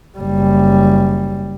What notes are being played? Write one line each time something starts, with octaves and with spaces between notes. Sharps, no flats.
F#1 G3